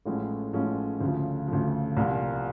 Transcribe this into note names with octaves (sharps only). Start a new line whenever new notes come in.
A1 A2 F3 G#3 C#4
A1 A2 F3 G#3 C#4
D2 C#3 F3
D2 C#3 F3
C2 A#2 F3